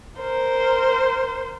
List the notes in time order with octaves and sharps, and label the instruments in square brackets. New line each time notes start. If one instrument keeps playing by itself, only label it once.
[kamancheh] A#4 C5